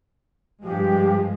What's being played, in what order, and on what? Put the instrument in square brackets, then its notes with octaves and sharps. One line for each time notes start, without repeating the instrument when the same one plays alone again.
[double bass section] G2 F3 G#3 [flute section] G4